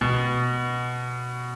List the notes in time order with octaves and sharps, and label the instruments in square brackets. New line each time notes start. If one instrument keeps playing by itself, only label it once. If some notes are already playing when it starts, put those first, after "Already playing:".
[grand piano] B2